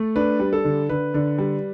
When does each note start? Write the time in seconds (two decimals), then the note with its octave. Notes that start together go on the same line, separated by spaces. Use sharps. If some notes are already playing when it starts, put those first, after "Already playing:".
Already playing: A3
0.16 D4 B4
0.40 G3
0.53 A4
0.65 D3
0.89 D3 B4
1.14 D3
1.38 G3